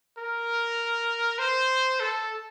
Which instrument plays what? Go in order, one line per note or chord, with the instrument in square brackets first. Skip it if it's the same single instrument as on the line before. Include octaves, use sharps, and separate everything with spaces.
[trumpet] A#4
C5
A4